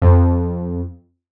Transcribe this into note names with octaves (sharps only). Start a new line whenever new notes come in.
F2